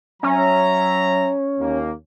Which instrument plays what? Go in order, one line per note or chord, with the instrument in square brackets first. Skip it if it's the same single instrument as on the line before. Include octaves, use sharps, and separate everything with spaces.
[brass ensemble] F#3 E5 A#5 [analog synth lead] C#4
[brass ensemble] D#2 A#3